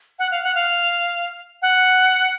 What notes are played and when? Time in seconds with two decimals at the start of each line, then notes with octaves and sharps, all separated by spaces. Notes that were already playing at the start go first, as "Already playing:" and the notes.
0.19 F#5
0.31 F5
0.43 F#5
0.55 F5
1.62 F#5